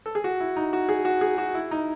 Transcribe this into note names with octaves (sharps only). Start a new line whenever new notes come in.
A4
G#4
F#4
E4
D#4
F#4
G#4
F#4
G#4
F#4
E4
D#4